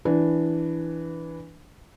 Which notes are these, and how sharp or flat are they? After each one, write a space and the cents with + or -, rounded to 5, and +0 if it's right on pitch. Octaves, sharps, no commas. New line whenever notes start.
E3 +0 D4 -5 B4 +0